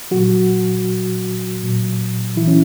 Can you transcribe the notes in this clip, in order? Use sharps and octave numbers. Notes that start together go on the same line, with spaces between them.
A#2 F#3 F#4
A#2 F#3
E3 E4
C#4